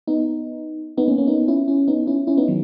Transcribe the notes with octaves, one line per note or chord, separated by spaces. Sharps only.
B3 D#4
B3 D#4
A#3 C#4
A#3 C#4
B3 D#4
C#4 E4
C#4 E4
B3 D#4
C#4 E4
C#4 E4
B3 D#4
D#3 F#3